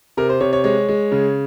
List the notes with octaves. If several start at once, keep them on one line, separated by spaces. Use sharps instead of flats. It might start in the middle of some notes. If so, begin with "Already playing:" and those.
C3 A#4
C5
C3 C#5
C#5
G#3 C#5
G#3
C#3